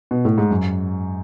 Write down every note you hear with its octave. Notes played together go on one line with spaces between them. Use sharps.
B2
A2
G#2
F#2